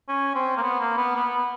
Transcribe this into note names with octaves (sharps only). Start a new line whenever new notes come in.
C#4
C4
A#3
B3
A#3
B3
B3